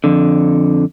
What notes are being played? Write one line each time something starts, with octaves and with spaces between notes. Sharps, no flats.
F2 D3